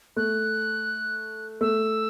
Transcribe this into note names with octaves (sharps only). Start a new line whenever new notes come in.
A3 F#6
A3 E6